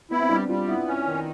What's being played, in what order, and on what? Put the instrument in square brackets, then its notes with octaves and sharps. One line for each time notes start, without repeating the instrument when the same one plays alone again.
[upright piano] B3 [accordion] E4
[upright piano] C4
[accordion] G3 [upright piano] D4
[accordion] G3 [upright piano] F4
[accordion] B3 [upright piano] E4
[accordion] C#4
D#3